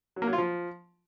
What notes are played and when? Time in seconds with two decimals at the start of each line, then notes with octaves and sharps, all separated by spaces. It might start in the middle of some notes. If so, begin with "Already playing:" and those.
0.16 F#3
0.22 A#3
0.27 F#3
0.33 F4
0.38 F3